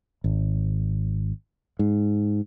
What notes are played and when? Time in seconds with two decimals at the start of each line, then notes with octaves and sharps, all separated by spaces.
0.24 G#1
1.79 G#2